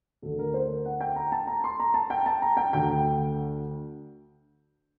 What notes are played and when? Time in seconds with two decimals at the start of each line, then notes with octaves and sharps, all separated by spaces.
0.22 D2 D3 A4
0.39 A#4
0.54 C5
0.70 A#4
0.85 F#5
1.01 G5
1.16 A#5
1.32 A5
1.47 A#5
1.64 C6
1.80 A#5
1.94 A5
2.10 G5
2.26 A5
2.42 A#5
2.57 G5
2.73 D2 D3 G5